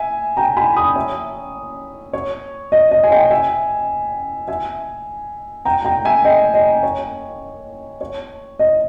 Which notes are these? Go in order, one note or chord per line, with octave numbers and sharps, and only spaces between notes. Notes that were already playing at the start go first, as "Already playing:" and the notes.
Already playing: E5 G#5
G5 A#5
G#5 B5
B5 D#6
C#5 E5
C#5
D#5
D#5
G#5
D#5 G5
E5 G#5
E5 G#5
G5 A#5
G5 A#5
E5 G#5
D#5 G5
D#5
C#5
C#5
D#5